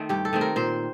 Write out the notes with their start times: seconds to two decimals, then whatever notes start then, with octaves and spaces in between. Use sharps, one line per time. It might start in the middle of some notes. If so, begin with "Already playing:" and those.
Already playing: D#3 A3 C4
0.09 G2 G4
0.25 A4
0.33 D#3 A3 C4
0.41 A#4
0.56 A#2 C5